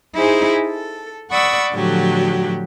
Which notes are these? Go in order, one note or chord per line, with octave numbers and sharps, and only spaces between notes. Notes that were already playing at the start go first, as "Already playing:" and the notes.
D#4 E4 G#4 C5 G#5
A4
D5 F#5 B5 C#6 D#6 E6
A2 D3 F3 F#3 F#4 G4